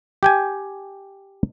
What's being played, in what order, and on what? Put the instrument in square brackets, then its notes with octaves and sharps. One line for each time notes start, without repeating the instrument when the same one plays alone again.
[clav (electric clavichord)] G4 G5 G#5